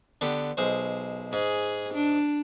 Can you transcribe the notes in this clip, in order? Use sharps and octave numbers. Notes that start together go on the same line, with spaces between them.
D3 B3 G4
B1 G#3 C5
G#2 G#4
D4